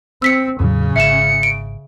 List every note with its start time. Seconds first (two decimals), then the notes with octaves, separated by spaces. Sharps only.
0.22 C4 E6 B6 C#7
0.60 E2 A2 C#3 F#3
0.96 G#1 E5 C#7 E7
1.43 D7